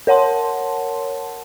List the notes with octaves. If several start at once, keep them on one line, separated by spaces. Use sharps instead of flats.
A#4 C#5 F#5 A5 C6